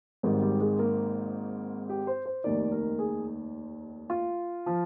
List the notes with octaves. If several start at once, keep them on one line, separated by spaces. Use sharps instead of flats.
G#1 G#2 D#3 G3
G3
G#3
A#3
G4
C5
C5
F1 D#2 D#3 D5
A#4
G#4
F4
F3